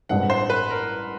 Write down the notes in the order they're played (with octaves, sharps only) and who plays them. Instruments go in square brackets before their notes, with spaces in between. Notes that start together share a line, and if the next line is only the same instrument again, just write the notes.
[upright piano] A1 G2 E3 G#3 C4 [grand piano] F#5
[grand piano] C5
B4
A#4